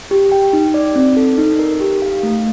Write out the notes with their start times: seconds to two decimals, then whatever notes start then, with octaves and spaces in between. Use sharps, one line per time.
0.11 G4
0.32 G5
0.53 D#4
0.74 D5
0.96 C4
1.17 A4
1.38 D#4
1.59 A#4
1.80 G4
2.02 F5
2.23 A3